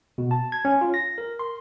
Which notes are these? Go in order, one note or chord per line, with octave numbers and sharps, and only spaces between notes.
B2
A5
G#6
C#4
F4
A#6
A#4
C6